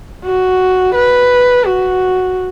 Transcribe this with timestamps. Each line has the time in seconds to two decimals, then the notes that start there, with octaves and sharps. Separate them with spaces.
0.25 F#4
0.95 B4
1.65 F#4